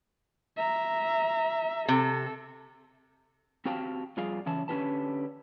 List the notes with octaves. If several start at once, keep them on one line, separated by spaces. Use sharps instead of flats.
E5 A#5
C3 A4
C4 F#4 G4 F5 G5 A5
F2 G3 F4 G#4 D5 F5
C#3 E3 C#4 A5
D3 C#4 F4 G4 B4 A5